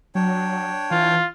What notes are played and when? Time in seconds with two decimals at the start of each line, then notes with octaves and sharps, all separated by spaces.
0.15 F#3 D4 C#5 G5
0.91 E3 F4